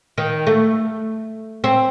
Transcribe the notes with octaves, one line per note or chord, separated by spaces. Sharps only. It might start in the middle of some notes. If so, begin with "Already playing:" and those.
D#3
A3
C4